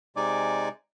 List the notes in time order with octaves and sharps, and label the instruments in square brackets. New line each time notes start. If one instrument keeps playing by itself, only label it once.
[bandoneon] C3 G#3 D#4 D5 G#5 D6